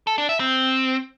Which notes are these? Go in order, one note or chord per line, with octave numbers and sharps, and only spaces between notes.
A4
D4
E5
C4